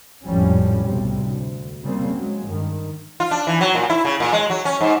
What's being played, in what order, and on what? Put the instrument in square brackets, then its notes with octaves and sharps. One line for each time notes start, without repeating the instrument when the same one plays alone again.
[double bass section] G#1 F2 A2 F3 G3 C#4
B1 A2 C3 G3
D2
C#3 G3 A#3 C4
F#3 G#3
G2 D#3
[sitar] F4
D4
E3
F#3
A#2
E4
C#3
A#2
G#3
F#3
C#4
G#2